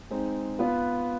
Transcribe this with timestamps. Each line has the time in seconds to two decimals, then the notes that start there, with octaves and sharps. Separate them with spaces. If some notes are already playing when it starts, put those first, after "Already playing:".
0.10 G#3 C4 D#4
0.59 B3 F4 B4